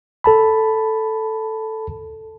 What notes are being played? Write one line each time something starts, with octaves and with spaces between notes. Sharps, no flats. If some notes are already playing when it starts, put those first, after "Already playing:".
A4 A5 B5